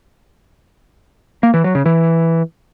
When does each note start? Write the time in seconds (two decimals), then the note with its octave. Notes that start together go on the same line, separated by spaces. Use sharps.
1.43 A#3
1.54 E3
1.64 F#3
1.75 C#3
1.86 E3